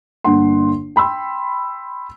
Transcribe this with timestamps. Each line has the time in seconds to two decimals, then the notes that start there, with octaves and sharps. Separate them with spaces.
0.24 G1 D3 A#3 D4 F#5 C6
0.96 G5 B5 C6 E6